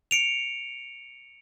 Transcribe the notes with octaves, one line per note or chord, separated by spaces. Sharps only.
C#7 D7 F7